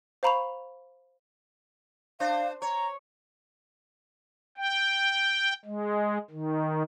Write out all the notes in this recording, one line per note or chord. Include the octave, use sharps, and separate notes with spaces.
C5 F5 A#5 B5 C#6 F7
D4 C5 F5
C#5 A#5
G5
G#3
D#3